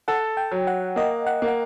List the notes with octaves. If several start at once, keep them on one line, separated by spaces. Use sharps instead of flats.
A4 F#5
G5
F#3
F#5
A#3 D#5
F#5
A#3
F#5